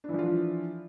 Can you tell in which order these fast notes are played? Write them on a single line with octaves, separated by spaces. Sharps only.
D4 E3 F3 F4